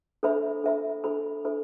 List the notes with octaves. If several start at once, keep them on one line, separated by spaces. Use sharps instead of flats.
D4 A4 C5 E5 B5
D4 A4 C5 E5 B5
D4 A4 C5 E5 B5
D4 A4 C5 E5 B5